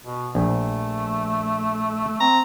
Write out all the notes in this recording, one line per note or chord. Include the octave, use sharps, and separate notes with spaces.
B2
A#1 A3
C4 A#5